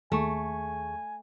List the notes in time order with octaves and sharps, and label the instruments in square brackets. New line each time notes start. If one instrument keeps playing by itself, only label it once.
[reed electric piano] D#2 G#4 C#6 [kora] A3 [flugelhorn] G#5